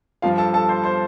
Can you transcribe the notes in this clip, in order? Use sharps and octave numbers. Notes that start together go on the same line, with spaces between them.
G2 F3 F4 F5
A4 A5
A4 A5
C5 C6
C5 C6